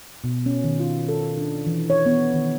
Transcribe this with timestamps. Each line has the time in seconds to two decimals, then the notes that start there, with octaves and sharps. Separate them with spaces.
0.24 B2
0.46 C#4
0.64 D#3
0.79 F4
1.09 A4
1.38 D4
1.66 E3
1.90 C#5
2.06 B3
2.34 D#3